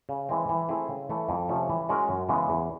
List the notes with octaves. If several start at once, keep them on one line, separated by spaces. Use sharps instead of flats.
C#3
E3 G#3 C4
E3
A3 C4 E4 G#4
C#3
E3 A3
F2
C3 F3 A3 C#4
E3
G#3 C#4 F#4 A#4
F#2
C#3 E3 G#3 B3
E2